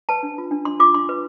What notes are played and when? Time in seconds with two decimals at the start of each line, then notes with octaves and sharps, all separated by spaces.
0.09 B4 A5
0.23 D4
0.38 F4
0.51 D4
0.65 D4 C6
0.80 F4 D6
0.94 D4 C6
1.09 B4